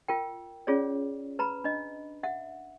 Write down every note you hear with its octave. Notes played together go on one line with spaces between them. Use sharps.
F4 A#4 G5
C#4 F4 G#4 C#5 D5
B4 A#5 B5
D4 D#5
E5 F#5